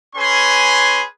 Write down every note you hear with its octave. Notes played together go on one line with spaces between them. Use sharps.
C#4 G#4 B4 G#5 C6